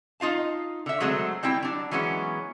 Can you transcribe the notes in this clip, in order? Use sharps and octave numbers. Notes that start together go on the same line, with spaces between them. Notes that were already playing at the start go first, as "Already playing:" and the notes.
D#4 F4 F5 A5
D3 E5
F#3 G#3 A3 C4
G3 C4 E4 G5
F#3 D4
E3 F#3 G#3 B3 C#4